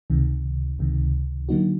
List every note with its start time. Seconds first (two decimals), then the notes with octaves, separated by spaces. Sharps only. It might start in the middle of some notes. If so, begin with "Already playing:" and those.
0.10 C#2 C3 D#3
0.79 C#2 C3 D#3
1.49 D3 F#3 A#3 D#4 F#4